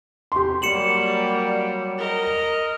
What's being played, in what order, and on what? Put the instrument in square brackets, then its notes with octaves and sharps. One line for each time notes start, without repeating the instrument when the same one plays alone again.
[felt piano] G4 C6
[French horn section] F#3 G3 [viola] A#3 [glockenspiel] C#7 E7 F#7
[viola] A#4 D#5